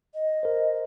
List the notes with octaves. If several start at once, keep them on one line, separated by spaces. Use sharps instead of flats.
D#5
A#4 C5